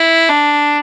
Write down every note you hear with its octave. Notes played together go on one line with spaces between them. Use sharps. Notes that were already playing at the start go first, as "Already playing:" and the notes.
Already playing: E4
D4